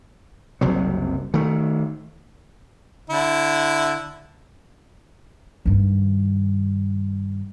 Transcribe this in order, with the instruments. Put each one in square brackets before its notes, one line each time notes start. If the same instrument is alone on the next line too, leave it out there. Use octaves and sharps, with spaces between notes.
[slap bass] F#1 C2 C3 F#3
D#3 A3
[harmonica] D3 E4
[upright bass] G2 D#3